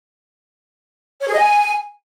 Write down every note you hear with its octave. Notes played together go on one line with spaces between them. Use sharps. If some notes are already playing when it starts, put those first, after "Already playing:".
C#5
G#4
D#5
G#5